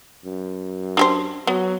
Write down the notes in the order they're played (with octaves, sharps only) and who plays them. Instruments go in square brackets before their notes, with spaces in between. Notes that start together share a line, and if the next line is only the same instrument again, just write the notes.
[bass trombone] F#2
[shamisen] D4 G4 C5
[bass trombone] F#3 [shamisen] B3